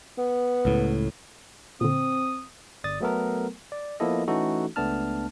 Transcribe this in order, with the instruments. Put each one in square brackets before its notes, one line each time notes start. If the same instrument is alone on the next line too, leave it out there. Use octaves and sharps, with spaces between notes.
[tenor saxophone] B3
[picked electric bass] C#2 A2
[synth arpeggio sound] A#2 D3 [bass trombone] C4 [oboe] D#6
[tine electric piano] G1 D5 D#6 A6
F#3 A3 B3 A4 A#4
D5
F3 A#3 B3 E4 A4 D#5
E3 A3 C#4 D#4 F#4 A4
C#2 A3 B3 D4 A5 F6